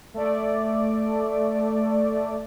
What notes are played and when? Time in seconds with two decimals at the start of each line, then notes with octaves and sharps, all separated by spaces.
0.14 A3 D5